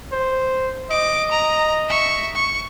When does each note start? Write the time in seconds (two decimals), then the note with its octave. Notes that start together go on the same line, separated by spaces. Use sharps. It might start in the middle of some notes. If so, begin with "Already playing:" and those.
0.12 C5
0.91 D#5 D6
1.32 A#5
1.89 E5 C#6
2.35 C#6